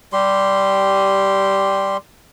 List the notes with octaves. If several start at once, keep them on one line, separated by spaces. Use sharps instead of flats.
G3 G4 C6